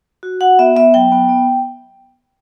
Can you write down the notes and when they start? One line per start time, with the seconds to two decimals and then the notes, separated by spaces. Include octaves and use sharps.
0.23 F#4
0.41 F#4 F#5
0.59 B3 E5
0.76 B3 E5
0.94 F#3 G5
1.12 B3
1.29 B3